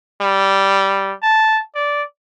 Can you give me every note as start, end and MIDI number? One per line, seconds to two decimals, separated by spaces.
0.21 1.13 55
1.23 1.61 81
1.75 2.02 74